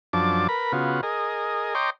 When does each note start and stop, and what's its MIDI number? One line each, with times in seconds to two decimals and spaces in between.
0.13 0.47 42
0.13 0.47 53
0.13 0.47 62
0.13 0.47 81
0.13 0.47 86
0.49 0.72 70
0.49 0.72 71
0.49 0.72 83
0.72 1.01 49
0.72 1.01 59
0.72 1.01 65
0.72 1.01 66
1.03 1.74 68
1.03 1.74 70
1.03 1.74 75
1.75 1.90 73
1.75 1.90 75
1.75 1.90 79
1.75 1.90 82
1.75 1.90 84
1.75 1.90 86